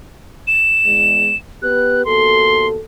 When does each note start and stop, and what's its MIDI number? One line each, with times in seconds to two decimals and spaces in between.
0.47 1.36 100
0.85 1.32 40
0.85 1.32 56
1.62 2.04 59
1.62 2.04 67
1.62 2.04 71
1.62 2.05 90
2.05 2.80 39
2.05 2.80 47
2.05 2.80 69
2.05 2.67 84